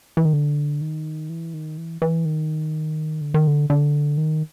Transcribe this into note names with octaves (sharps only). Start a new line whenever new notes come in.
E3
D#3
D3
D#3
E3
D#3
E3
E3
D#3
D3
D#3
D3
D3
D#3